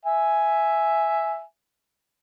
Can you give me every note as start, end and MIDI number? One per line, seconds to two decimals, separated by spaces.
0.05 1.42 76
0.05 1.42 80